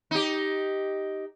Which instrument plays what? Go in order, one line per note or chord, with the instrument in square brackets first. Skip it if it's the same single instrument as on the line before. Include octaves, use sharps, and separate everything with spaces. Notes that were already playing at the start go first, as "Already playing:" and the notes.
[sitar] D#4 G4